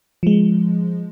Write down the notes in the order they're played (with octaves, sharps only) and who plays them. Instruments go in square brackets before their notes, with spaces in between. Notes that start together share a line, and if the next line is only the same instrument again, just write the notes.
[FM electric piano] F3 G#3